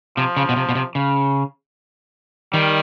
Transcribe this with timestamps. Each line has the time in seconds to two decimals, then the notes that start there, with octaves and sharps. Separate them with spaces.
0.16 C3 F3
0.37 C#3
0.49 B2
0.56 C3
0.69 B2
0.75 C3
0.95 C#3
2.53 D#3 G3